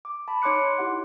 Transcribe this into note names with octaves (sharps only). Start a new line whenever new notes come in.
D6
A5 B5
D#4 C#5 C6 D6 F#6 C#7
E4 G4 F#5